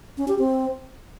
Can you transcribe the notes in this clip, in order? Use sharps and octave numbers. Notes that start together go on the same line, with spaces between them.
C#4
G4
C4